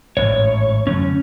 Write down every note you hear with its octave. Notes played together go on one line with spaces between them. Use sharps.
A1 G#2 C#5
F#2 D3 A3 C#4